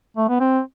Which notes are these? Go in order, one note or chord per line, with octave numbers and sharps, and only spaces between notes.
A3
B3
C4